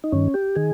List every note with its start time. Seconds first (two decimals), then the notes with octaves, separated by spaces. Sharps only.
0.04 D#4
0.12 G2 D#3 C#4
0.34 G4
0.56 D#3 G#4